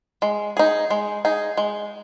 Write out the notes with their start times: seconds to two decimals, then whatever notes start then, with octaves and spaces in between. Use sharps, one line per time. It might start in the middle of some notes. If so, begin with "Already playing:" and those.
0.22 G#3
0.57 D#4 G#4
0.90 G#3
1.25 D#4 G#4
1.57 G#3